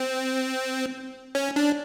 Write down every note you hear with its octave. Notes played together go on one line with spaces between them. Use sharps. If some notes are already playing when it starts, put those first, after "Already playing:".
Already playing: C4
C#4
D4